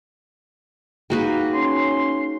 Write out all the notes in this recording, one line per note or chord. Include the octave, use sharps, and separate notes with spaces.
A#3 D#4 F#4 G#4 B4 G5
C#4 C6